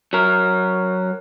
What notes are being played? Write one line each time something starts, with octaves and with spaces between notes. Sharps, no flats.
F#3 A#4